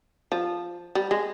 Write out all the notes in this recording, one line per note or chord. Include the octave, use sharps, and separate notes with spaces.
F3
G3
G#3